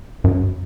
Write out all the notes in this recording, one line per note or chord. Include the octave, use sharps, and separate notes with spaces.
F#2